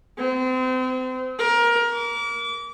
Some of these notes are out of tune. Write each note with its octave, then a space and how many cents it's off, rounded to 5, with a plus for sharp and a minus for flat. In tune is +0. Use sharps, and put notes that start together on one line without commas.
C4 -35
A#4 +20
D6 -30